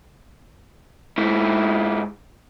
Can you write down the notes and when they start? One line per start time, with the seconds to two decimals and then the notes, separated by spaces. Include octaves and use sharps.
1.18 G#2 E4